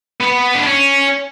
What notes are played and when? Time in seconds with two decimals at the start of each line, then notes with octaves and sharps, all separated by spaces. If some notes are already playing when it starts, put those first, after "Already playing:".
0.21 B3
0.54 D4
0.66 C#4